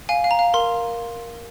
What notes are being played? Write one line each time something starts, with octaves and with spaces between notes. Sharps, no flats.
F5 G#5
F5
A#5
F5
A#4 C6